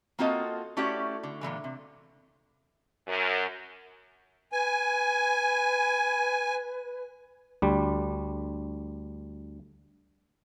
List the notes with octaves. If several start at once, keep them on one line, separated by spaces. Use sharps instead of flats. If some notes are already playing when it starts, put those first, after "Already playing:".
A#3 C4 F4 F#4 A4 D#5
A3 C#4 E4 F#4 G4 D5
D3
A#2 D3 E3 G#3
C3
F#2
B4 G#5
D2 G3